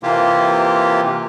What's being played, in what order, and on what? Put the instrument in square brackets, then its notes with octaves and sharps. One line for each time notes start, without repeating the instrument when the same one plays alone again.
[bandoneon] C3 E3 A#3 F4 G4